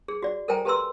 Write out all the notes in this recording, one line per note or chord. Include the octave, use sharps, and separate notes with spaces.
G#4
F#4 D5
A4 A#4 C5 G5 G#5 A#5
G4 A4 B4 A#5 C6 E6